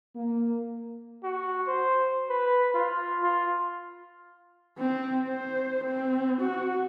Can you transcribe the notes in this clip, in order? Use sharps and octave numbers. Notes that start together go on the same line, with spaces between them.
A#3
F#4
C5
B4
F4
F4
C4
C5
C4
F#4